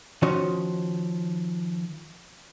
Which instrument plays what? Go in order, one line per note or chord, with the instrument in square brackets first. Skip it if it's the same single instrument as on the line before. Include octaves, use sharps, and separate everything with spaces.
[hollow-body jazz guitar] D#3 F3 C#4 F#4 D#5